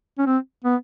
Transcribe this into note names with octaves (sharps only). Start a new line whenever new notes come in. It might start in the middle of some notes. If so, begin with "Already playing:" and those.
C#4
C4
B3